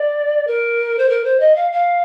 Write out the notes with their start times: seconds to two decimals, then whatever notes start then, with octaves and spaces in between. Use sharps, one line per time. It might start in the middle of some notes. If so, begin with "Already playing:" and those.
Already playing: D5
0.47 A#4
0.98 C5
1.09 A#4
1.24 C5
1.40 D#5
1.55 F5
1.72 F5